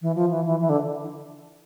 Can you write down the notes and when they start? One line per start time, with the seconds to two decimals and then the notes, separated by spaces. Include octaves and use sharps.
0.02 E3
0.15 F3
0.31 E3
0.46 E3
0.60 E3
0.70 D3